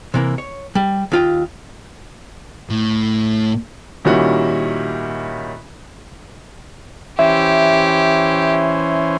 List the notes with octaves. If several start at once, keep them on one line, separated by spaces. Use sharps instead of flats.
C3 E3 A#3
C#5
G3
D#2 F4 G5
A2
A#2 D#3 G3 C#4 E4 F#4
E3 C#4 G4 C5 E5